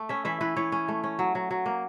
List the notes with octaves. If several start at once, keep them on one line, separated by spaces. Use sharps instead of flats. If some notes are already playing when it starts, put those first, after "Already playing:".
Already playing: A3
C#4 E5
E3 E5
E3 B4
E3 C#5
C#4
A3
C#4
F#3
F#3
F#3
A#3